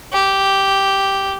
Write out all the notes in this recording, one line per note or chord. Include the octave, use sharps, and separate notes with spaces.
G4